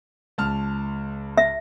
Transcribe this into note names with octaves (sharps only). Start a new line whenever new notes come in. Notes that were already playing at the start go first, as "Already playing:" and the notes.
C#2 A5 F6
E5